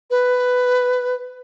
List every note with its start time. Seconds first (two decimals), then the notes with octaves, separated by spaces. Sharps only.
0.10 B4